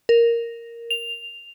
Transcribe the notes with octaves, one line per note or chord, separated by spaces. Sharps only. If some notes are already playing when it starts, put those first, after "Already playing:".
A#4
F7